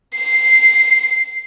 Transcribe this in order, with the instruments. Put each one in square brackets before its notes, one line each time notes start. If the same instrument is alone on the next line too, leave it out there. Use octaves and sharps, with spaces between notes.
[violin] C7